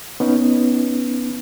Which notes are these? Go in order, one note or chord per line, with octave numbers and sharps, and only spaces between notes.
B3 C#4 D#4